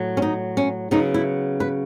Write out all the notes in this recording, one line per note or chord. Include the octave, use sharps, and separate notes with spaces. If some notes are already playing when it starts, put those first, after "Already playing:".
Already playing: A2 F#3
C#4
D#4
C#4
C#3 F#3 B3 D#4
E4
B4